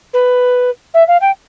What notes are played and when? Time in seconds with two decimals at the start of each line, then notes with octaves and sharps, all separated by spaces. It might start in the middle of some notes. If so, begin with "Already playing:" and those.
0.13 B4
0.94 E5
1.08 F5
1.21 G5